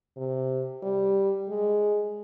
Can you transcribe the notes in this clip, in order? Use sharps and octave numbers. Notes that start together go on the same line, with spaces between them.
C3
G3
G#3